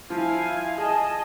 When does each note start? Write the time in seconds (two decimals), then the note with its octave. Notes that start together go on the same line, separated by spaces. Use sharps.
0.10 F3 E4 F5 G#5
0.78 G#4 D#5 A5